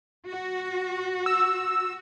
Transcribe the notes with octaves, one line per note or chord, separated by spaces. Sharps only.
F#4
E6